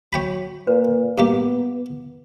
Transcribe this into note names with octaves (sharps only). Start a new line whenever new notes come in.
F#3 C#5 G5 B5
A#2 B4
G2 A#3 B3 G4